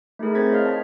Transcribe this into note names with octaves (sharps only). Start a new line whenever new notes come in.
A3 D#4 E4 G#4 A#4
C4 C5 G#6 A6 B6
C#5 D#5 F5 F6
A5